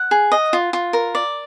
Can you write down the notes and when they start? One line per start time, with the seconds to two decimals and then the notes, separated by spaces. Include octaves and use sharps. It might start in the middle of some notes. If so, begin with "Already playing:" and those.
Already playing: F#5
0.11 G#4
0.32 D#5
0.53 F4
0.73 F4
0.93 A#4
1.15 D5